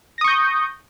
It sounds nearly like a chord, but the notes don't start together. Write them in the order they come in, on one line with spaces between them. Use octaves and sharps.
A#6 D#6 C#6 G6